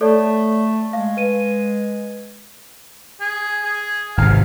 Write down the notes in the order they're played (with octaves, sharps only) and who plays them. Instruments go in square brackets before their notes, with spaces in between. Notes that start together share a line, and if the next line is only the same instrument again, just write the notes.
[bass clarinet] A3 [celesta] A4 C#5 D5
[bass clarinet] G#3 [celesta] F5
[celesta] B4 D#7
[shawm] G#4
G#4
[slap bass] G#1 C3 [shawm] F5